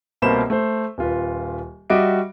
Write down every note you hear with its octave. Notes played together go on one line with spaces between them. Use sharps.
C2 B2 A#3 C5 B5 E7
A3 C5
D#1 F4 B4
G3 F#4 D#5 E5 D6 D7